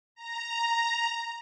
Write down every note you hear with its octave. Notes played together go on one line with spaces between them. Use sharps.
A#5